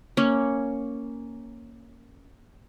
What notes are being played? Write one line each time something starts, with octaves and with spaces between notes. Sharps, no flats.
A#3 C#4